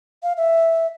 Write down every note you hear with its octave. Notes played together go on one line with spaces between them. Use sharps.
F5
E5